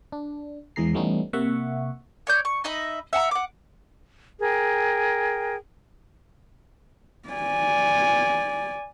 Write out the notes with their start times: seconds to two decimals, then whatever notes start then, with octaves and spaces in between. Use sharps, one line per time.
0.12 D4
0.76 E2 E3 G#3 G#4 A#5 C7
0.94 E3 G3 A3 B3 C#4 D#4
1.33 C3 A#3 E5 F#5 C#6
2.27 C#5 D5 G6
2.45 C#6
2.64 D#4 D#5 E5 B5
3.13 E5 F#5 A5 A#5
3.31 F#5 D6
4.40 G#4 A#4 G5
7.29 D5 G#5